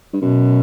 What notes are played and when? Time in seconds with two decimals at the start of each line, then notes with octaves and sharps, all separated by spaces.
0.13 G2
0.22 F#2 B2